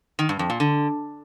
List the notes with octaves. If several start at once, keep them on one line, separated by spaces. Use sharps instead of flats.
D#3
G2
F2
A#2
D3